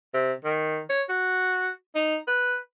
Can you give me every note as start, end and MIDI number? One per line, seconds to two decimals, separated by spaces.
0.14 0.33 48
0.45 0.81 51
0.89 1.03 73
1.09 1.70 66
1.95 2.18 63
2.27 2.58 71